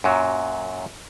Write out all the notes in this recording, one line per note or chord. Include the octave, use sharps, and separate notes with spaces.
F#2 A#2 F#3